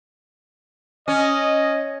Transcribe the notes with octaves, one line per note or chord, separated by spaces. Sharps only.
C#4 D#5